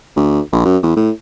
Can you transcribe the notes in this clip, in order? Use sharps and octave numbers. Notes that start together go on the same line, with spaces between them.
D2
A#1
F#2
E2
A2